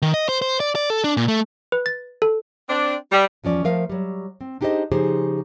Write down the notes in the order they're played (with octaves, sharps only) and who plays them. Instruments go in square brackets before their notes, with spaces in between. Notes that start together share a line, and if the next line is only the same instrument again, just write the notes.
[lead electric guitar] D#3
D#5
C5
C5
D5
D5
A4
D4
A#2
A3
[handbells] B4
A6
A4
[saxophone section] C4 D4
G3
[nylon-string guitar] E2 F3 C#4 D5
F3 A3 A#4 E5 F5
F#3 G3
C4
D4 D#4 G4 G#4 C5 D#5
C#3 F3 D#4 G4 G#4 C5